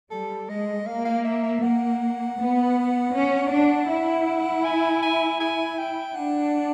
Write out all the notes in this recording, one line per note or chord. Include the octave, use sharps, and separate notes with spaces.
G3 A4
G#3 D#5
A#3 F5
F5
E5
E5
A#3 F#5
B3
C#4
D4
E4
G#5
G#5
G#5
G5
D4 F#5